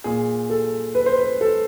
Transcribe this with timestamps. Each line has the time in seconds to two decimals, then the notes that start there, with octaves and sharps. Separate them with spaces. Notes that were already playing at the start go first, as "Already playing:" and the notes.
0.04 A#2 G#4
0.50 A4
0.95 B4
1.06 C5
1.18 B4
1.41 A4